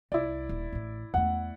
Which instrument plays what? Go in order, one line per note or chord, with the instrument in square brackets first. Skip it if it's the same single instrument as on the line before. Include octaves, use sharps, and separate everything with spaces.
[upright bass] C2 [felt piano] E4 D5
[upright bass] D#1
A1 A2
[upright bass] E2 A3 [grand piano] F#5